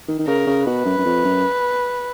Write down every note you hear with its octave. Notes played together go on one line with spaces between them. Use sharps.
D#3
D#3
C#3 A#4
C#3
B2 B4
F#2
F#2
F2
F#2